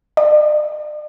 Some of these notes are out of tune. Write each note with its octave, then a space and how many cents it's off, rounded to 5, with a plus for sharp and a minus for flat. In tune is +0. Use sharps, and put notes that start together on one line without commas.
D5 +45